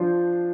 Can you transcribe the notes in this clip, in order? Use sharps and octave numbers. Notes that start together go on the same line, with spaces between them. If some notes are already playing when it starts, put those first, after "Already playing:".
Already playing: F3 D4 F4 C5